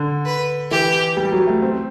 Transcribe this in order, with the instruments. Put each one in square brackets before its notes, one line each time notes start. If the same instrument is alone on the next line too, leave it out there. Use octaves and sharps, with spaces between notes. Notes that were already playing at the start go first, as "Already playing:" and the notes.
Already playing: [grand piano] D3
[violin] B4
[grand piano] E3 [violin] G4
[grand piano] G3
F#3
A3
C4